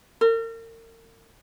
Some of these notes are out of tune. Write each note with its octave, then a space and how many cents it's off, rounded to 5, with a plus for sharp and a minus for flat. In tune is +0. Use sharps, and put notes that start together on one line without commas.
A#4 -40